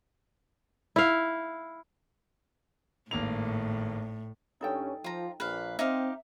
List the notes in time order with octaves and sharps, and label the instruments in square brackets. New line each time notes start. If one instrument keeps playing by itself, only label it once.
[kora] E4 F5
[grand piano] G#1 A#3 F7 [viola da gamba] A2
[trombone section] G2 C#4 [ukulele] D#4 A4 G5
[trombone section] F3 [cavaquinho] F4 A#5
[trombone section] A#1 A#3 [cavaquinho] B4 F5
[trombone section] C4 [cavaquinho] D#4 G4 F5 [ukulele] E5